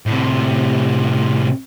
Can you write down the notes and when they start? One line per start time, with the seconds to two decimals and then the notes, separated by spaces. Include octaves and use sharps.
0.06 A2 C3